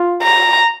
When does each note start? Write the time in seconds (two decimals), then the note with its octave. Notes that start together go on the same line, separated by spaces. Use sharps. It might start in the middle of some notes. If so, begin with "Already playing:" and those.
Already playing: F4
0.23 A#5